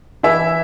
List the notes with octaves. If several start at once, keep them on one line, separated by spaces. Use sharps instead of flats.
E3 E4 E5